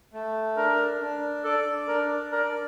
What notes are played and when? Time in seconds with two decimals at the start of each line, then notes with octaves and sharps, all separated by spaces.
0.14 A3
0.57 D4 A#4
1.01 D4
1.44 A4 D5
1.88 D4 A#4
2.32 A#4 D5